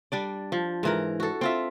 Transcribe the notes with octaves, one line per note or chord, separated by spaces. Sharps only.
G3 D4 D5
F3
G#2 E3 A#4
F#4 A4
C4 F4 E5